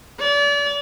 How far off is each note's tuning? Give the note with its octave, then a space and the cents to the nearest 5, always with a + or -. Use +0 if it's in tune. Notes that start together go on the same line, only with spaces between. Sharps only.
D5 -35